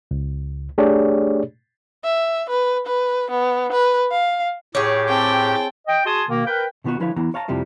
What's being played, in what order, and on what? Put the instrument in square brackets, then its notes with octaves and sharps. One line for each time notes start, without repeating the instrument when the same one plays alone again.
[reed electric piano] C#2
A3 D4 G4 G#4 C#5 D5
[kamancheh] E5
B4
B4
B3
B4
F5
[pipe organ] A2 G4 D6 [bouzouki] G#4 C#5
[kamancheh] C4 A5 [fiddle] G5
[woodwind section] D#5 G5
F#4 G#4 G#5 A5 C6 D#6
B2 D#3 A#3
A#4 B4 G5
[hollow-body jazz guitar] B2 D#3 B3 F4 F#4
D3 F3 E4 B4 C#5 F5
E3 B3 E4 A#5
C#5 F5 A5 A#5
F2 C3 F3 G3 E4